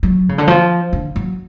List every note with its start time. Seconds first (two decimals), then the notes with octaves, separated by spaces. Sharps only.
0.03 F#3
0.29 C#3
0.38 D3
0.47 F3
0.93 D3
1.16 F#3